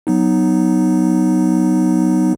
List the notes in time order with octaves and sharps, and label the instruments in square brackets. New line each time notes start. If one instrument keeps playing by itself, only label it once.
[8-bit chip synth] F#3 B3 D#4